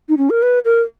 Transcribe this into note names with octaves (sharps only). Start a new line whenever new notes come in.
D#4
C#4
A#4
B4
A#4